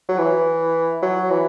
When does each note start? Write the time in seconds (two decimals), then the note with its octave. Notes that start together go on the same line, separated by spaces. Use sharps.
0.09 F#3
0.18 E3
1.02 F#3
1.30 E3